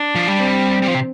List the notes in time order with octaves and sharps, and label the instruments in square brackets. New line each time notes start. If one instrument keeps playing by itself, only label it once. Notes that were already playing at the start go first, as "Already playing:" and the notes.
Already playing: [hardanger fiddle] D4
[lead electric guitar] F3
G3
[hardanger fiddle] C4
[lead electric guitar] G3
F3
C3